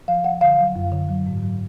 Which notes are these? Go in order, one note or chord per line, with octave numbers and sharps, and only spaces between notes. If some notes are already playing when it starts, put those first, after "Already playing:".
F3 F5
F3 F#5
D3 F5
F#3
F#2
D3
F#3
G#2
F#3